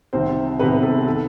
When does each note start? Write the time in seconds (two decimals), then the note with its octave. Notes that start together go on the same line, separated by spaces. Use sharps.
0.13 C2 C3 D#3 C4 C5
0.59 C2 C3 D#3 B3 B4
0.82 A4
1.06 D#3 A4